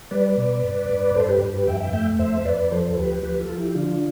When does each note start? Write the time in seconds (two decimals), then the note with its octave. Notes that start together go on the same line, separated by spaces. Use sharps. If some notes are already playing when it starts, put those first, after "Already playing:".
0.11 G3 B4 D5
0.37 B2
0.64 G2
0.89 G2
1.15 G2 A4 C5
1.28 G4 B4
1.41 G2
1.54 G4 B4
1.67 F2 E5 G5
1.80 E5 G5
1.93 A3 E5 G5
2.19 F2 C5 E5
2.45 F2 B4 D5
2.60 D5
2.71 F3 A4 C5
2.93 C5
2.97 D2 G4 B4
3.23 F3 G4 B4
3.40 F4 A4
3.50 F3
3.58 E4 G4
3.75 D3 D4 F4